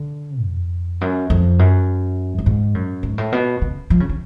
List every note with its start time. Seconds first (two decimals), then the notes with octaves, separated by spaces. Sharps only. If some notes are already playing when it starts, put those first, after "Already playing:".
Already playing: D3
0.43 F2
1.01 F#2
1.30 F2
1.59 F#2
2.38 F#2
2.46 G#2
2.75 F#2
3.03 G#2
3.18 A2
3.32 B2
3.62 C#3
3.90 F3
4.00 C#3
4.09 D3